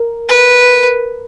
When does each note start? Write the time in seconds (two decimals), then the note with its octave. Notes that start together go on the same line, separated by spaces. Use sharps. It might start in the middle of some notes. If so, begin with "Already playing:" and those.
Already playing: A#4
0.29 B4